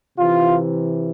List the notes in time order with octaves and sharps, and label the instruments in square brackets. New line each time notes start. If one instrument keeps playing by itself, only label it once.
[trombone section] C3 E3 F4